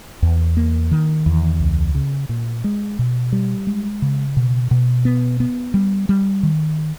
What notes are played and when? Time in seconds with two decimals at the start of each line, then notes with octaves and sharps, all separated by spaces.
0.22 E2
0.57 A#3
0.91 D#3
1.26 E2
1.60 C#2
1.95 C#3
2.29 A#2
2.64 G#3
2.99 B2
3.32 G3
3.67 G#3
4.02 C#3
4.37 B2
4.71 B2
5.05 B3
5.40 B3
5.74 G3
6.09 G3
6.43 D#3